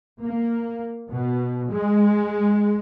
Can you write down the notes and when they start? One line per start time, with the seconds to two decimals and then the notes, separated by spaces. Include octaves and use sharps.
0.21 A#3
1.10 B2
1.71 G#3